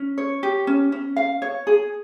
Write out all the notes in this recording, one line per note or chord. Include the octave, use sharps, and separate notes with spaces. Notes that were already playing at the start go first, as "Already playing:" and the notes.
Already playing: C#4
C#5
G4
C#4
C#4
F5
C#5
G#4